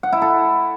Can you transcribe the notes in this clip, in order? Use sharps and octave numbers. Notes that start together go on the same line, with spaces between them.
F#5
E4
A4